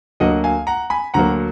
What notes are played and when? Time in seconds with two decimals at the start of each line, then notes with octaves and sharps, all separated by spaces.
0.20 D2 D3 F#3 A#3 D#5 F#5
0.44 F5 G#5
0.67 F#5 A#5
0.90 G#5 B5
1.14 D2 D3 F#3 A#3 F#5 A#5